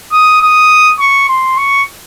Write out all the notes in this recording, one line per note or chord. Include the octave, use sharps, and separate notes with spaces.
D#6
D#6
C#6
C6
C#6